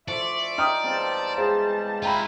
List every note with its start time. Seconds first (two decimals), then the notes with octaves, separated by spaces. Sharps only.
0.08 D2 F3 D5 E5 C#6
0.58 D#4 G5 D#6 F6
0.84 E2 G3 C4 F4 A5
1.38 G#3 G#4 C5 F5 A#5
2.03 E4 F4 F#5 G5 A#5 B5